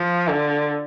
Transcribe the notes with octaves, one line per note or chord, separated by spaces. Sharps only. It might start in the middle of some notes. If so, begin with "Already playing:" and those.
Already playing: F3
D3